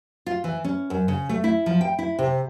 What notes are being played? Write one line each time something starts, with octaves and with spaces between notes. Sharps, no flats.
F4
E3
C#4
F#2
C#3
A3
E4
F3
G5
E4
C3